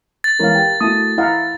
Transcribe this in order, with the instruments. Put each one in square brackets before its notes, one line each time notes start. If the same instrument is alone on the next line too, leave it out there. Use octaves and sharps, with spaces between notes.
[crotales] A6
[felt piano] E3 G#3 C#5 [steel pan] A#4 F5
[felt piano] G4 G5
[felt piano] A3 E4 F#4 [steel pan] A5 D#6
[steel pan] E4 F5 F#5 [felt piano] D#5 A#5 F6